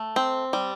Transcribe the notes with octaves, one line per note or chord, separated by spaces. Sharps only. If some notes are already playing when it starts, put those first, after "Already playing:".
Already playing: A3
C4
G3